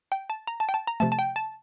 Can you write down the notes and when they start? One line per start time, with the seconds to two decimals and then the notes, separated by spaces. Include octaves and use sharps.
0.12 G5
0.30 A5
0.47 A#5
0.60 A5
0.69 G5
0.74 A5
0.87 A#5
1.00 C3 F3 A3 A5
1.12 A5
1.19 G5
1.36 A5